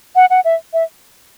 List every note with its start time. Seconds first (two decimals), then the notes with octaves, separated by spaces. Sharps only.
0.16 F#5
0.30 F#5
0.45 E5
0.73 E5